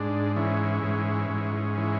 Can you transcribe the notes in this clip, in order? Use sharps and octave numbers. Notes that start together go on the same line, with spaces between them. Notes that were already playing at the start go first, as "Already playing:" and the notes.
Already playing: G#2 D4
E3 C#4
G#2
G#2
E3